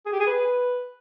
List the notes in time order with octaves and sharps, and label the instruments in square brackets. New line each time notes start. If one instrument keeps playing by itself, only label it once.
[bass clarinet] G#4
G4
G#4
B4